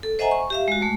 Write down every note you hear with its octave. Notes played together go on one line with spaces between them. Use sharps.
A4
C5 D#5 E5 F#5 G#5 A#5
C#6
G4 E5 F5
G#3 F#4
G#3 A3